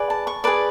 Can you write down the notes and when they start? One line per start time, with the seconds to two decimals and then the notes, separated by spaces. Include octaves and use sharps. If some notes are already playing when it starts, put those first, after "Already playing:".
Already playing: G#4 B4 D5
0.10 A5
0.27 C#6
0.44 G#4 B4 D5 A5